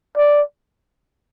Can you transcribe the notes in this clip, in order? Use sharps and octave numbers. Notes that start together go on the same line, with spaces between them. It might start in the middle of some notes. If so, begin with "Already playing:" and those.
D5